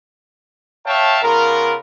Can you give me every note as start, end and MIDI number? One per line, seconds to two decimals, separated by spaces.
0.86 1.19 73
0.86 1.19 76
0.86 1.19 77
0.86 1.19 79
0.86 1.19 81
1.23 1.76 49
1.23 1.76 59
1.23 1.76 65
1.23 1.76 70